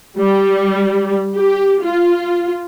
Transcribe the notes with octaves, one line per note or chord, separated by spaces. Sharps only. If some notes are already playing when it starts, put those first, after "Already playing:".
G3
G4
F4